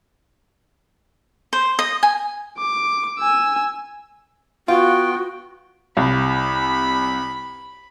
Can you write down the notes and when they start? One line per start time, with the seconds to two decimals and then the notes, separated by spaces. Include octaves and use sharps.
1.53 C5
1.79 D#5
2.03 G#5
2.58 D6
3.19 G#5 E6
4.68 B3 F4 F#4 G5
5.97 C2 B5